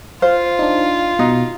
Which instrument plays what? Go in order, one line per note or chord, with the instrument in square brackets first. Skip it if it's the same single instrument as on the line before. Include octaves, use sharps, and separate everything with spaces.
[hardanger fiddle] F4 [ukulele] C5 [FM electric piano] F5
[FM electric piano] D4 D#4
[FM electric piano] B2 [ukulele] D#4